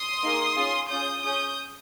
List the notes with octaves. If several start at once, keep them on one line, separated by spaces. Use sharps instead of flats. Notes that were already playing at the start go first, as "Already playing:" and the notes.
Already playing: C6 D#6
A#3 D#4 G#4
C#4 F4 G#4
C#4 F4 G#4 D#6 G6
C#4 G#4 D#6 G6